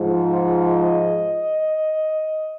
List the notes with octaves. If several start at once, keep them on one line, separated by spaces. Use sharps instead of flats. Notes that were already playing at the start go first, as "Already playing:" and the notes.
Already playing: G#2 F3
D#5